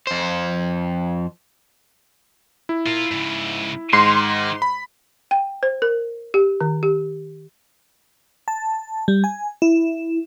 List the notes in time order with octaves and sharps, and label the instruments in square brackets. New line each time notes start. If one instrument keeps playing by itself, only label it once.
[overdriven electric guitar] F2 C5
[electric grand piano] E4
[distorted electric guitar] F4 A#4
G#2 C#3
[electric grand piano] G#2 [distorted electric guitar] D#3 D#4 [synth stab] C6
[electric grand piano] B5
[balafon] G5
C5
A#4
G4
D#3
G4
[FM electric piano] A5
G3
G#5
E4